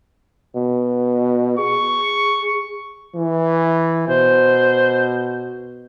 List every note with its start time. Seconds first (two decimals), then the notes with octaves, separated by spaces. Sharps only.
0.55 B2
1.58 G#4 C#6
3.15 E3
4.08 B2 C5